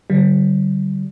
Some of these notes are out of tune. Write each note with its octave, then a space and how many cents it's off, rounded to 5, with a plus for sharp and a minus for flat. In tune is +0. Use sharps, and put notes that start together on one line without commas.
D3 -10 G3 -40